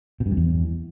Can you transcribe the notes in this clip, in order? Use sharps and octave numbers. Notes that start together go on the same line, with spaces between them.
B2
G2
F#2
E2